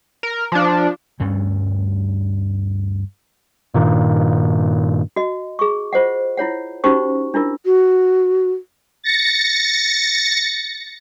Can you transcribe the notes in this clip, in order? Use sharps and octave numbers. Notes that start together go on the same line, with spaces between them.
A#4
F3 D4
D2 G2 G3 C#4
G2 A#2 D#3
F#4 D#5
G#4 C#6
F4 C5 D#5 F#5
E4 F4 C#5 F#5
C#4 D#4 F#4 G4 C5 C#6
D4 E4 F4 A#4
F#4
A6 A#6 C#7